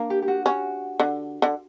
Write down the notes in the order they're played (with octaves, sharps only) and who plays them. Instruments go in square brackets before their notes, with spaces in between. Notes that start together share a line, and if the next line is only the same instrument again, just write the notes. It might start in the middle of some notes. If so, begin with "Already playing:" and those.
Already playing: [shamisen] A#3 [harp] D4
[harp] G4
G4
F#4
[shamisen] C#4 [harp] F#4
[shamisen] D3
D3